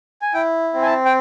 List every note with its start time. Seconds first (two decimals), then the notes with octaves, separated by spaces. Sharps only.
0.22 G#5
0.34 E4 G5
0.74 C4
0.82 G#5
0.86 A5
1.05 G5